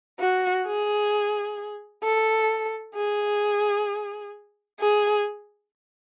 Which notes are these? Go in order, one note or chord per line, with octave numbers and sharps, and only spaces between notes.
F#4
G#4
A4
G#4
G#4